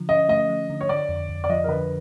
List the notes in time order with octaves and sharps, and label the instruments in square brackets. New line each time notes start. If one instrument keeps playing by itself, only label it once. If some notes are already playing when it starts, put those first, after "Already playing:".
Already playing: [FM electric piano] D3 F3
[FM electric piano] C#4 [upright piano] D#5
[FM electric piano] A3 [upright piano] D#5
[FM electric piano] F3
D3
[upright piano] C#5
[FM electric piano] D3 [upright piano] D5
[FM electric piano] F2
F2
[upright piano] D5
[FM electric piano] F3 [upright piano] D#5
[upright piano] A#4
[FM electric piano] D3 [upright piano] B4